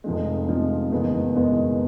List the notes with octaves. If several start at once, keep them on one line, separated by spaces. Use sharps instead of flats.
F1 F2 C3 F3 G#3
F1 F2 C3 F3 G#3
F#1 E2 B2 G#3 B3
F#1 E2 B2 G#3 B3